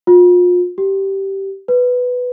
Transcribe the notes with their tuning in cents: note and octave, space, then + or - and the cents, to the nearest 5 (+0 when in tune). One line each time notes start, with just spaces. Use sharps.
F4 +35
G4 -10
B4 +5